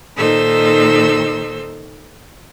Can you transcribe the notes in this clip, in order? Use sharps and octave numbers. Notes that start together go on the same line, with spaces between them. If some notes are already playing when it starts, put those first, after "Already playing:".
A#2 D#3 D#4 A4 C5 E6